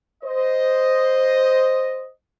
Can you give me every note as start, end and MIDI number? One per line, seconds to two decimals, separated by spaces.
0.24 2.10 72
0.24 2.10 75